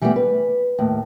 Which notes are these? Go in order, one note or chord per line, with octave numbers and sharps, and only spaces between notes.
E3 G3 A3 B3 G4
B4
D#2 A2